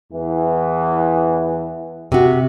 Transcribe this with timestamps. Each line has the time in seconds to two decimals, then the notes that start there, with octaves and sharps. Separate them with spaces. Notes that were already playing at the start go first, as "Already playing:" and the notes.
0.11 E2 E3
2.12 C3 F#4